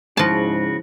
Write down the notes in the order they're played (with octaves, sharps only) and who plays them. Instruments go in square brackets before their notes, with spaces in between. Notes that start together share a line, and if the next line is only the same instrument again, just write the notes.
[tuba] G#2 [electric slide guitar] C#3 F#4 [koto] F3 A5 [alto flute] E4